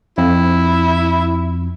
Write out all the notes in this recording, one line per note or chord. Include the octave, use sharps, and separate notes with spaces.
F2 E4